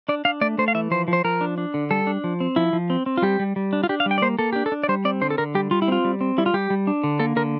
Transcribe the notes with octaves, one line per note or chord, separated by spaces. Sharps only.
D4 D5
D4 F5
A3 D5
A3 C5
F5
E3 E5
F3 C5
F3
C5
F3 A#4
D4
D4
D3
G3 A4
D4
F3
C4
F3 E4
F3
C4
C4
F4
G3 G4
G3
G3
D4
F4
D4 G4
F5
G3
G5
D5
A#3 C5
A#3 A4
D4 G4
A4
D4
D5
G3 C5
C4 D5
D3 C5
A4
D3 A#4
G3 G4
G3 F4
E4
C4 F4
G3
C4
G3 E4
F4
G3 G4
G3
D4
D3
A#3 A4
D3 A#4